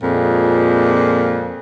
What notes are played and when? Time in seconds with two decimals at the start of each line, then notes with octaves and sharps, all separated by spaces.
0.01 F2 A#2 G#3